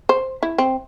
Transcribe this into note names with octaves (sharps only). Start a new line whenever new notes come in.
C5
E4
C4